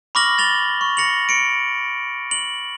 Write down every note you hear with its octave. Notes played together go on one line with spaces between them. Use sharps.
B5 C#6 D6 F6 A#6 F#7
A6 F7 G7
C#6
A#6 C#7 F7 F#7
C#7 D7
F#7